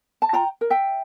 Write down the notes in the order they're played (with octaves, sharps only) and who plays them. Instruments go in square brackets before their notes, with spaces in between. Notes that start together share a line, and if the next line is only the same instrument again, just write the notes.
[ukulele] A5
F4 G5 A#5
A#4
E5 G5